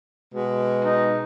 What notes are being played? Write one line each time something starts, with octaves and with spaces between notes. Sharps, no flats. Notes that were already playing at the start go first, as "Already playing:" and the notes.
B2 G#3
D#4